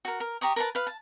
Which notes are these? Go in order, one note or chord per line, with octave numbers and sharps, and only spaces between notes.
F#4 A#4
A#4
G4 A#5 C#6 D#6
A#4 B4 A5
B4 F5
A5